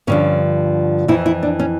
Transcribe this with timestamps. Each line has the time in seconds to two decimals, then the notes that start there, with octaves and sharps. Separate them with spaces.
0.07 G2 D3 F3 C#4
1.08 F2 E3 E4
1.26 E4
1.43 D4
1.59 C#4